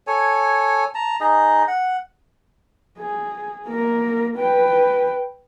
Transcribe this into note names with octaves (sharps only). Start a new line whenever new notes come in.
A4 C#5 G#5
A5 A#5
D#4 G#4 D#5
F#5
G#4
A#3 A#4
B4 G5